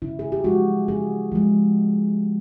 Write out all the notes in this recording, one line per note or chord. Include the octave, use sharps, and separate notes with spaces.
C#3 E4
G#4
G4
F3 G#3 F#4
C#3 G#4
F3 G#3